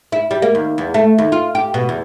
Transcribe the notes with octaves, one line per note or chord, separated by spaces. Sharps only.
E4
G3
A#3
D#2
E2
A3
D#2
F4
G4
B2
E2